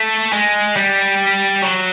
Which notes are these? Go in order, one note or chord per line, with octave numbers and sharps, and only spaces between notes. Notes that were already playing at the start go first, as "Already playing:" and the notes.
Already playing: A3
G#3
G3
F#3